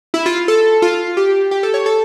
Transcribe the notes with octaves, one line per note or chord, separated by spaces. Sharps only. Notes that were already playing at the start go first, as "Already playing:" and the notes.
E4
F4
A4
F4
G4
G4
A4
C#5
A4